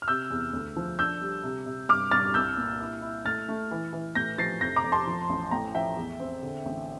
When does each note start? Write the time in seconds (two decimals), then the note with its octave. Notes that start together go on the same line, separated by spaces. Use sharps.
0.02 F6
0.08 C3 E6 G6
0.31 E2
0.53 D2
0.76 F3
0.99 D4 E6 G6
1.21 G3
1.43 C3
1.66 C3
1.89 G2 D6 F6
2.11 G2 F6 A6
2.34 C2 E6 G6
2.57 A#2
2.80 E4
3.02 E4
3.25 A3 F6 A6
3.49 A3
3.71 E3
3.93 E3
4.15 A2 G6 A#6
4.38 F3 A6 C7
4.61 F1 G6 A#6
4.76 A#5 D6
4.84 F2
4.92 A5 C6
5.07 F3
5.29 A1
5.51 A2 G5 A#5
5.74 F3 E5 G5
5.97 E2
6.20 C4
6.43 D3
6.66 A1